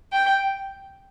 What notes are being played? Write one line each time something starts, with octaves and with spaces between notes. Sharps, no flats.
G5